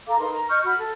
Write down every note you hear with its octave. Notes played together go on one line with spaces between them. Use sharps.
A4 F5 A#5 D6
D#4 A#4 B4 C6
A#5
D#5 C#6 F6 G6
F#4 B5 F6
A4